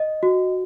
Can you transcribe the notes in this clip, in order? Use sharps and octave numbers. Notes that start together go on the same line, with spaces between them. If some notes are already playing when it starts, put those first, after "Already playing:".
Already playing: D#5
F#4